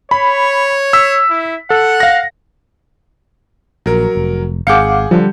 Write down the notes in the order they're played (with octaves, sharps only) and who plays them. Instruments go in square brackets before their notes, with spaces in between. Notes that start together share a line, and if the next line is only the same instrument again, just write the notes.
[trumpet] C#5 [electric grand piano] B5
[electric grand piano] E6 B6
[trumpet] E4
[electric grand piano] A4 [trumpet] F#5
[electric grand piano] F5 A#6
[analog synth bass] A#1 [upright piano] F#3 A#4
[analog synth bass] F1
[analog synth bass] G#1 [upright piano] G#4 G6 C#7 [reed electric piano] F5 F#5 D6
[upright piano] D3 [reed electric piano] F3 [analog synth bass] G3